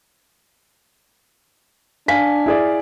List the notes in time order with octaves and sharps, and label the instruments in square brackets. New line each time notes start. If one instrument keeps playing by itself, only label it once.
[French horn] D4 [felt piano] F5 G#5 B6
[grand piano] E4 G#4 D5